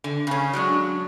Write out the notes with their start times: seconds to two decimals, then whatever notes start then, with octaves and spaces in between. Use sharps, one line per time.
0.04 D3
0.27 C#3 C#4
0.53 F#3 G#3 D4